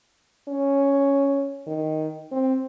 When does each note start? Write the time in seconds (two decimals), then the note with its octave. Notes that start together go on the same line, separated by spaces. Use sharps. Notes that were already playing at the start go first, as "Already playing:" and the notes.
0.48 C#4
1.67 D#3
2.32 C4